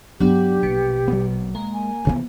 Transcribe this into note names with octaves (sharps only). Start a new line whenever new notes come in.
G2 F#3 B3 D4 G4
A#1 B2
F#3 A#3 B3
G#3 A#3
G#5
D2 C3 E3 F3 B3